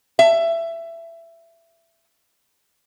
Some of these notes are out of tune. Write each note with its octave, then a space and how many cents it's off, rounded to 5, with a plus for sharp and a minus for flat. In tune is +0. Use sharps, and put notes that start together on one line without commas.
E5 +15